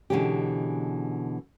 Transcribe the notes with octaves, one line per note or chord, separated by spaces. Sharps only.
B2 D3 E3 G#3 C#4 G4